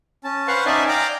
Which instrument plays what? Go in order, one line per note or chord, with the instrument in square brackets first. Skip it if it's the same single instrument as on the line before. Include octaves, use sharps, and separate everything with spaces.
[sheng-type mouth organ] C#4 A5
B4 C5 F5 F#5 C6 C#6
C#4 D#4 D5 E5 G#5 A5
D5 F5 G5 A#5 D6